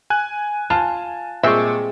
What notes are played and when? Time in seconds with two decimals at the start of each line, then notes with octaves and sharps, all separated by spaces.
0.10 G#5 F#6
0.70 F4 A5
1.43 A#2 G3 G#3 C4 E5 C#6